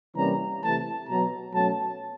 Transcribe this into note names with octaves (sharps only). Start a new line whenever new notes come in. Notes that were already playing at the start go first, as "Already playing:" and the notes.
C3 E3 G3 A#3 C#4 A#5
C3 E3 A3 A5
B2 F#3 B3 A#5
B2 F#3 A3 C#4 A5